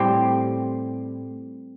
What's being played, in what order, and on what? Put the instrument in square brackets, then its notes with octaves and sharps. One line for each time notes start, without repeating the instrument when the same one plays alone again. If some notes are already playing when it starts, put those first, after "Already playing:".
Already playing: [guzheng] A2 G3 C4 G4